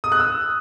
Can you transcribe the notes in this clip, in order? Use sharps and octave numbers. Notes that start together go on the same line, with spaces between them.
D#6
F#6
E6